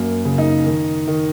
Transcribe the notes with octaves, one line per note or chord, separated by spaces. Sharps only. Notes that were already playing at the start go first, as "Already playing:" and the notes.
Already playing: F#2 A#3
C#3
D#4
D#3
D#3